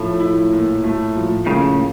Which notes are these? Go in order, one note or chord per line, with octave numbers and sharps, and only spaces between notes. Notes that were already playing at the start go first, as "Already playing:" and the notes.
Already playing: A2 F3 A3
E4
A#2
A3
F3
A2 C#3 A#3